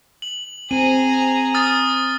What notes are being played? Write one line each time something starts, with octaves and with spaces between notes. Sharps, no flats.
F#7
C4 G#4 A#5 D#7
D#6 F6 A6